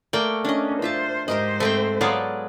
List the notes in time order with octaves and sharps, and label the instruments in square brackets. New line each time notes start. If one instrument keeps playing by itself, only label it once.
[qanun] A3 [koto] A#3 D5 G5
[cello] C#4 [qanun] D4 D#5
[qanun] F4 E5 A5 [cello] C5
[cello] G#2 C5 [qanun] G4 A#4 D#5
[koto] A3 C4 G5
[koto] F#3 G#3 B3 [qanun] A4 D5 F5